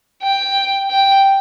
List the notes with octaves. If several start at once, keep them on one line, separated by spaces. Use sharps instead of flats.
G5
G5